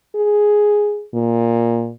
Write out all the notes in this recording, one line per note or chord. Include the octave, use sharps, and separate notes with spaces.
G#4
A#2